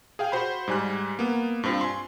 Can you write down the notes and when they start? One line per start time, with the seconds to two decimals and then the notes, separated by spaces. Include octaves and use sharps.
0.19 G#4 F5 G5
0.32 F#4 C5 B5
0.68 G#2 G3 G#5 F#6
1.19 A#3 B3
1.63 G2 C4 F4
1.81 G#5 C6